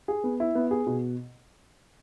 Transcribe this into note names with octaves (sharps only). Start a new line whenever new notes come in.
G#4
B3
E4
B3
G#4
B2